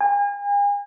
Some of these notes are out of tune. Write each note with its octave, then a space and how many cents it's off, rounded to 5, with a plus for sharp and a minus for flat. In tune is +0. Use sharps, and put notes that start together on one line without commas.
G#5 -40